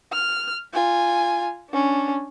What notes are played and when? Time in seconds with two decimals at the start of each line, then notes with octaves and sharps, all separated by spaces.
0.13 F6
0.74 F4 G#5
1.69 C#4 D4